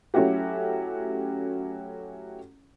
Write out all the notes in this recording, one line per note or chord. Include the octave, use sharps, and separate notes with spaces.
F#3 A3 C#4 E4 F#4 G4